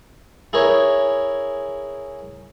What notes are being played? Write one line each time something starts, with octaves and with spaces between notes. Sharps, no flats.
E4 G#4 A#4 C#5